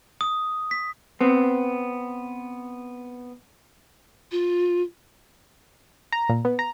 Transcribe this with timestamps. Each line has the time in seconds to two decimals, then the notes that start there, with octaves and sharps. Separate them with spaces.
0.21 D#6
0.71 B6
1.21 B3 C4
4.32 F4
6.12 A#5
6.29 A#2
6.45 B3
6.59 A#5